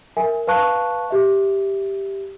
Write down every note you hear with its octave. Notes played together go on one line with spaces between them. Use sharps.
A#4 E5 G#5
B4 F5 A5 C#6 F#6
G4 E5